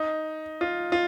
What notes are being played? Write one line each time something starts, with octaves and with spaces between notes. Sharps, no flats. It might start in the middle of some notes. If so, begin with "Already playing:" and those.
Already playing: D#4
F4
F4